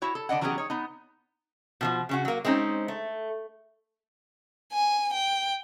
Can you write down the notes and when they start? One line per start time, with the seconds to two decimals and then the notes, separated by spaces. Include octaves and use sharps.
0.02 E4 F#4 C#5
0.15 A4
0.29 D3 D4 D#5 F#5
0.41 E3 F#3 B3 C#4 G4 G#4
0.58 D#4 C#5
0.70 B3 D#4
1.81 B2 E3 F3
2.09 C#3 C#4 F#4
2.25 F#3 A#3
2.45 G#3 C4 C#4 D#4
2.88 A3
4.73 G#5
5.13 G5